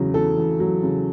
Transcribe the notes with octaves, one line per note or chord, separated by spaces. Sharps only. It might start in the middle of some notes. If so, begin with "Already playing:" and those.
Already playing: E2 C#3 F#3
E2 A4
E2
F#3
C#3